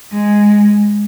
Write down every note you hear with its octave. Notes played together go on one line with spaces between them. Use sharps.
G#3